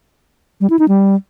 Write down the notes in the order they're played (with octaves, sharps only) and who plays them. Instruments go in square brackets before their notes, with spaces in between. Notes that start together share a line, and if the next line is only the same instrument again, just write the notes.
[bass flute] G3
E4
D#4
G3